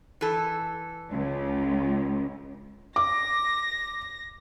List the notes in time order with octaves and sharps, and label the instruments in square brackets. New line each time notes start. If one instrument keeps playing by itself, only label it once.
[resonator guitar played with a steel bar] E3 A4
[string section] C#2
[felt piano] D6 [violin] A#6